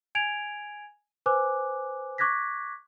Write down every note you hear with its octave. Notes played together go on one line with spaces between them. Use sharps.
G#5 G#6 D7 F7
B4 C5 G#5 D6 F#6
C#6 D6 F#6 G#6 A#6 B6